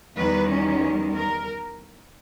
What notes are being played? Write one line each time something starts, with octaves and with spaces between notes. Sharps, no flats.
E2 D#3 G3 B4
C#4
A#4